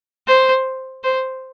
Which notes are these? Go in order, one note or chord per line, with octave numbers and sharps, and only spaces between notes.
C5
C5